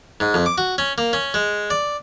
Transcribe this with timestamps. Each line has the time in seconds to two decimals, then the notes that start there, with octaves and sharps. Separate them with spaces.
0.20 G#2
0.34 F2
0.46 D6
0.58 F#4
0.78 C#4
0.98 A#3
1.13 C#4
1.34 G#3
1.70 D5